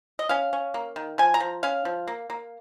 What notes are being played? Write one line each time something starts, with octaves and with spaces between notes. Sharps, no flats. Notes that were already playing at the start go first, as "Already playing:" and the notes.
D#5
C#4 F5
C#4
A#3
D#3
F3 G#5
A#5
F3
C#4 F5
F3
A#3
A#3